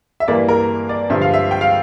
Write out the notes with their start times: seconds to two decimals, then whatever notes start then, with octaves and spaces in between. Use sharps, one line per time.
0.20 E5
0.28 G2 E3 A#3 D5
0.48 A#4
0.89 D5
1.10 G2 D3 F3 E5
1.22 F5
1.34 E5
1.51 G5
1.61 F5